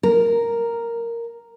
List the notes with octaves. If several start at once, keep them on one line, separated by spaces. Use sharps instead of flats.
A#4